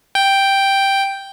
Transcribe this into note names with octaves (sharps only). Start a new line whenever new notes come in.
G5